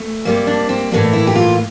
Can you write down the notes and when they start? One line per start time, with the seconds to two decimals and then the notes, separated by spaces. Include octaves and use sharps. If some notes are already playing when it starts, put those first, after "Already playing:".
Already playing: A3
0.25 C3 G3 A#3
0.47 D4
0.69 C4
0.91 A2 E3 A#3 D4
1.13 E4
1.27 G4
1.35 F4